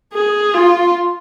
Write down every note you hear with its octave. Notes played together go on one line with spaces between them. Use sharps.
G#4
F4